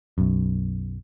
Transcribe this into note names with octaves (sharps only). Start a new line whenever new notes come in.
B1 F#2